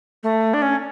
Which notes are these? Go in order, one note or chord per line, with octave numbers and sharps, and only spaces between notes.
A3
D4
C#4